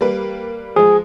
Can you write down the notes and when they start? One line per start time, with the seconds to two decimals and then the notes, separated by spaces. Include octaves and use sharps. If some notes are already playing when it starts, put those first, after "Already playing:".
0.01 G3 A#3 B4
0.76 F3 G#3 G#4